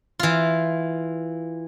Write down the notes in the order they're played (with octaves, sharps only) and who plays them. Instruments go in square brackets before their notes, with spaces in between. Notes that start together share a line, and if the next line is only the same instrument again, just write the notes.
[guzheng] E3 F4